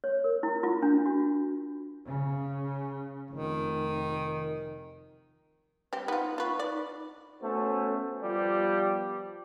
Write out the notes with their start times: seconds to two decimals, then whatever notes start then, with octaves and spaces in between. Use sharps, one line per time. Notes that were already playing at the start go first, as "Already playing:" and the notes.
0.04 C#5
0.24 A#4
0.43 E4
0.63 F4
0.83 D4
1.06 F#4
2.05 C#3
3.31 F1 D#3
5.93 G3 C4 G4 B4
6.08 B3 D#4 F4
6.38 F4 B4 C#6
6.59 D#4 D5
7.41 A3 B3 C#4 F#4 A4 C5
8.22 F3 G3 B3 F4 G4